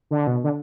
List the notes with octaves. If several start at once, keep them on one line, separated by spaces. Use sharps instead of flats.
D3
B2
D3